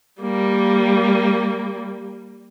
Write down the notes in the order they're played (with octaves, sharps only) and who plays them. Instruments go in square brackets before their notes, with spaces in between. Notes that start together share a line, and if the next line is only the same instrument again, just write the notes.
[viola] G3 A#3